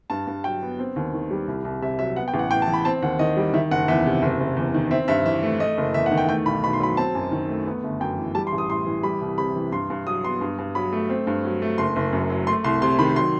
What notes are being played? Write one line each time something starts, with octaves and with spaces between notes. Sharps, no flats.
G2 A5
G2
F#3 G5
B3
C4
D#2
D#3
G3
C2
C2
C3 E5
F#3 E5
B3 F#5
G5
A1
F#5
A2 G5
A5
E3
B5
C4 A5
D#2 F#5
D#3 D#5
G3
D#3 E5
F#1 F#5
E2 E5
C3
F#1
F#1
E2
D#3
C4 E5
G2 E5
E3 E5
A3
A3 D#5
F#1
E2 E5
F#5
D#3
G5
A3 G5
B1 B5
B2 B5
C6
F#3 B5
C4 A5
F#2
D#3
A3
B3
G1
F#2 G5
E3
G3 A5
C6
A1
D#6
A2 C6
E3
G3 B5
C2
C3 B5
E3
G2 C6
G2
F#3 D#6
B3 C6
G2
G2
F#3 B5
A3
C4
G2
F#3
A3
F#1 C6
F#1
F#2
F#3
A3 C6
C2 C6
C3 C6
D#3 B5
F#3 C6